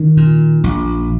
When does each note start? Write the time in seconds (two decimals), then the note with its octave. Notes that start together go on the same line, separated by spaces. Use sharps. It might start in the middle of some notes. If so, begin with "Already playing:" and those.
Already playing: D#3
0.17 A#2
0.64 A#1